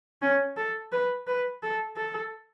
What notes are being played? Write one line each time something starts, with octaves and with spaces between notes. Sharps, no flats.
C#4
A4
B4
B4
A4
A4